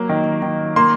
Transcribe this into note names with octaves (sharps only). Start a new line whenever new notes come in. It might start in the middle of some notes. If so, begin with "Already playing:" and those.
Already playing: F#3 A#3
D#3
D#3
A#3 C6